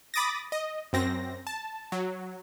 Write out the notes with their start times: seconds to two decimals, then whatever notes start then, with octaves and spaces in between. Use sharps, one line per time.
0.14 B5 D6 D#6 A6 A#6
0.52 D#5
0.93 F#2 C4 A#6
1.47 A5
1.92 F#3